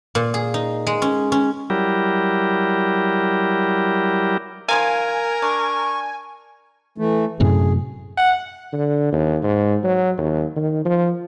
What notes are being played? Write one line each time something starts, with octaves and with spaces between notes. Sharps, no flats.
A#2
G#4
D#4
G#3
C#4
C#4
F#3 G3 E4 G4 A#4
D#3 F3 A#4 F5 G#5
D4 C#6
E3 A3
F#2 A2 C3 G#4
F#5
D3
D#2
G#2
F#3
D#2
D#3
F3